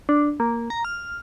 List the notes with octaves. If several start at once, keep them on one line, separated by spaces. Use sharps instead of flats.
D4
A#3
A#5
F6